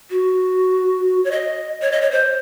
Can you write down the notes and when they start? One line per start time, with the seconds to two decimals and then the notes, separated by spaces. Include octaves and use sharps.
0.10 F#4
1.24 C#5
1.31 D#5
1.82 C#5
1.92 D#5
2.02 C#5
2.11 C5